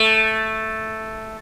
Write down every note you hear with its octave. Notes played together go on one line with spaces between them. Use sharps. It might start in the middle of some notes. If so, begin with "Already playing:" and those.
Already playing: A3